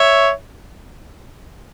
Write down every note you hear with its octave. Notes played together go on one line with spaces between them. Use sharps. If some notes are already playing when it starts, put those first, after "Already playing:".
Already playing: C#5 E5